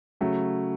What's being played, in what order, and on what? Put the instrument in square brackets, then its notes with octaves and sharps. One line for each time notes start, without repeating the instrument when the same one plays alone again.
[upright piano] C#3 F#3 A3